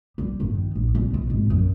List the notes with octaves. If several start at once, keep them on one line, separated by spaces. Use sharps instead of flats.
G3
G1
D#3
A#1
C2
B2
G#1
F#2